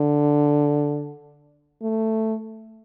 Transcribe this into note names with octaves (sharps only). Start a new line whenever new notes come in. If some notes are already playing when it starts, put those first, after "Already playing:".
Already playing: D3
A3